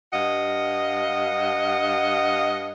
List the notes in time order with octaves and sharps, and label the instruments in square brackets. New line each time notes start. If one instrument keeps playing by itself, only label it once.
[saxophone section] G2 D#5 F5 F#5